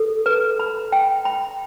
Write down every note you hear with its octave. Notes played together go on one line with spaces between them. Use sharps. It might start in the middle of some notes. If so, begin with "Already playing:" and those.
Already playing: A4
B4
B5
G5
B5